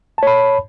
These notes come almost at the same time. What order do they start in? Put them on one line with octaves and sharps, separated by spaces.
A5 C#5 B5